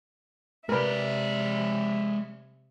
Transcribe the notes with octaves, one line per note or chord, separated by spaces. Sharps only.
C3 G#3 A#4 B4 D5 E5